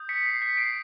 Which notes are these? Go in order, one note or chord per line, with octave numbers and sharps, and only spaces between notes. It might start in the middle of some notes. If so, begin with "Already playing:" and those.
Already playing: D#6 G6
B6 C#7
C7
B6 C#7
C7 D7